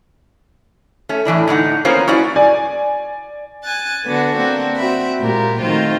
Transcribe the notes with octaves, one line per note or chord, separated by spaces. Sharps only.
A3 C#4
A2 E3 D4 E4
A2 D3 D#4 F#5
A#3 B3 C#4 F4 A#4 C5
C#4 E4 F#4 D5
D5 G#5
G#5 F#6 A6
D3 B3 D4 F#4 A4
A#3 C4 D4 F#4
C4 F#4 E5 B5
A#2 G#3 G4 A#4
D#3 A3 C4 F4 F#4 C5